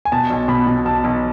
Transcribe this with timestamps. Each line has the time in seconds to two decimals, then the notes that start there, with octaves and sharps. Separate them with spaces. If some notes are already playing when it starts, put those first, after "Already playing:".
0.05 G#5
0.12 B2 A5
0.30 B1
0.48 B2 B5
0.67 B2
0.85 B1 A5
1.04 B1